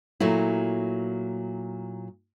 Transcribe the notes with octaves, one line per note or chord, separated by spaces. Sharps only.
A#2 F#3 A3 E4